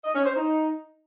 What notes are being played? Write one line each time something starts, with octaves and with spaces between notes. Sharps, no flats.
D#5
C#4
C5
D#4